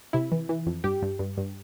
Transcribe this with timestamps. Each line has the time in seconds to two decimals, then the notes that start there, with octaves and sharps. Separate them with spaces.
0.13 C3 E4
0.32 E3
0.49 E3
0.66 F2
0.84 G2 G4
1.02 G2
1.19 G2
1.37 G2